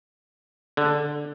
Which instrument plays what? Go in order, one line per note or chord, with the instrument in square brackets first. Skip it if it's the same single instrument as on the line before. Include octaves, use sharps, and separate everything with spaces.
[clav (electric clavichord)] D3